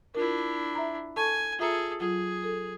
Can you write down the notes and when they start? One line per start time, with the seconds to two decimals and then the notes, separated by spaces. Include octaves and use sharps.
0.15 D4 E4 F4 A#4
0.75 E5 A#5
1.16 A4 G#5 A5 C#6
1.59 F4 G#4 A4 E5 A#5
2.00 F#3 F4 G#4
2.44 A4